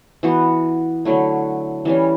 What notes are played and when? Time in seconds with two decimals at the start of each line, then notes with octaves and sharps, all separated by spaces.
0.23 E3 B3 F#4
1.05 D3 F#3 A3 E4
1.85 E3 G3 C#4